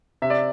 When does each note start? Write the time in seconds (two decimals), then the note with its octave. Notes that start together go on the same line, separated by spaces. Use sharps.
0.22 C3 E5
0.30 D5